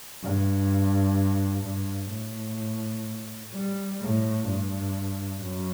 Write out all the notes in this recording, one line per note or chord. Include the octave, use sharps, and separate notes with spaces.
G2
G2
A2
G3
A2
G2
F#2